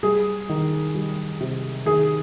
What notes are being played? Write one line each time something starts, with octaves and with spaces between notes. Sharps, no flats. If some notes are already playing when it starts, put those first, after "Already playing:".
G3 G#4
D#3
G3
C3
D#3 G#4